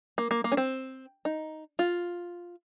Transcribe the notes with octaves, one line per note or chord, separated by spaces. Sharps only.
A#3
A#3
A#3
C#4
C4
D#4
F4